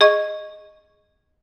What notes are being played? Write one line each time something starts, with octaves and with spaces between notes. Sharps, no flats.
G#4 D#5 C#6